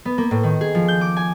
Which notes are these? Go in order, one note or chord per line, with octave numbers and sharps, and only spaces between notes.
B3
A#3
A2
D#3
G#4
F3
G6
D6
G#5